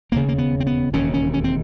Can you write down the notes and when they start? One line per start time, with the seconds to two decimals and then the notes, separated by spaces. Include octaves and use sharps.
0.12 E1 D#2 C#3 A#3
0.29 A#3
0.38 B3
0.60 C4
0.67 B3
0.93 E1 D#2 C#3 C#4
1.14 C#4
1.34 C#4
1.44 C4